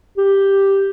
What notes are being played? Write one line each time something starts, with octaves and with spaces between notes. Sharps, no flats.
G4